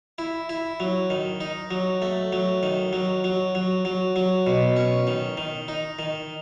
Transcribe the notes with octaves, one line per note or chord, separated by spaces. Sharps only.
E4
E4
F#3
D#3
D#4
F#3
A3
F#3
D#3
F#3
F#3
F#3
F#3
F#3
B2
C#4
D#3
D#3
D#4
D#3